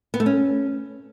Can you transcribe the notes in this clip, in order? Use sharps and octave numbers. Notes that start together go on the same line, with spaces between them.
B3
A3
C#4